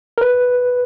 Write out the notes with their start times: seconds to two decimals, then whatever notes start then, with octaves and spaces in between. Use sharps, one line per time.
0.18 A#4
0.21 B4